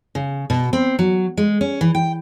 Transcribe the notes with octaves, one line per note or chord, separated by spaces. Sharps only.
C#3
B2
C4
F#3
G#3
C#4
E3
G5